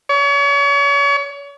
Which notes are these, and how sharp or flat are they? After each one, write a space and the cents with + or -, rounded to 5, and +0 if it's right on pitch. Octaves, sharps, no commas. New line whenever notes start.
C#5 +35